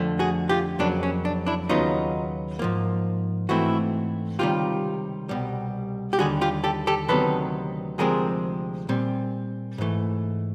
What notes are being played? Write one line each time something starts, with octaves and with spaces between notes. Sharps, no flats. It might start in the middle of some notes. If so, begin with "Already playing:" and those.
Already playing: F2 D3 F3 A3
F#4 G#4
F4 G4
F2 C#3 F#3 A#3 D4
C#4
D4
D4 E4
D#2 C#3 F#3 B3 D#4 F4
G#2 F3 A#3
G#2 E3 A3 C4 E4 F#4
C#2 C3 D#3 G3 F4 G4
C2 B2 G3
G4
D#2 D3 G3 F#4 G#4
F4 G4
G4 A4
G4 A4
D2 C3 D#3 F#3 B3 A4 B4
D2 C3 F3 G#3 C4 G#4 A#4
A#2 G3 C4
G#2 E3 A3